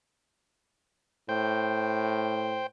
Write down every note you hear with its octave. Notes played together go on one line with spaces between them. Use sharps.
A2 C5 G5